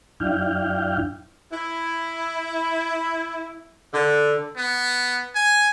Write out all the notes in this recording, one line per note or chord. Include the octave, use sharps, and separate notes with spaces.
F#2 D4 E4 F5 G5
E4
D3
B3
G#5